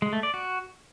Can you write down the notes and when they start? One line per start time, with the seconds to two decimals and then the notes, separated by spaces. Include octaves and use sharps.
0.02 G#3
0.13 A3
0.23 D5
0.34 F#4